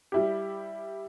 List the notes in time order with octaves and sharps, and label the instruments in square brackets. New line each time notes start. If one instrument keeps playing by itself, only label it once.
[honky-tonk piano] G3 E4 G4